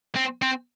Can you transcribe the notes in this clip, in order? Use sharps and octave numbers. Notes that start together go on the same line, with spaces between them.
C4
C4